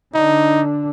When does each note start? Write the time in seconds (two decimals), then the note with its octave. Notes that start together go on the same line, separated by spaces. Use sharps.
0.15 D3 D4 D#4